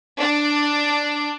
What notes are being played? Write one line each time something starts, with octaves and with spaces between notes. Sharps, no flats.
D4